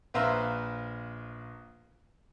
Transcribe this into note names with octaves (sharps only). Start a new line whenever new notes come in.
A#1 B4 C5 E5 F5 A#5